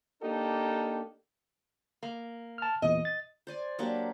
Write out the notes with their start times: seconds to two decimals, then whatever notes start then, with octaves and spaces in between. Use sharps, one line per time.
0.22 A#3 D4 D#4 G4 A4
2.03 A#3
2.58 A5 F6
2.82 E2 A#2 E3 D#5
3.05 A6
3.47 C5 D5 G#5
3.79 F#3 A#3 D4 G4